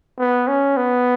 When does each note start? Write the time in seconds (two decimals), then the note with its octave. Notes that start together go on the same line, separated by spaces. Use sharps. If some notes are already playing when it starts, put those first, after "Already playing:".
0.19 B3
0.48 C#4
0.77 B3